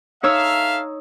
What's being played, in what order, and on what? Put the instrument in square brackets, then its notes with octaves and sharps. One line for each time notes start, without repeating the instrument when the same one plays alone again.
[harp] D#4 C#5 E6 [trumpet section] A4 E5 F5